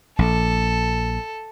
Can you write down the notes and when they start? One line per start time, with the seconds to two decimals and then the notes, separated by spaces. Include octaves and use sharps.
0.19 A#1 A4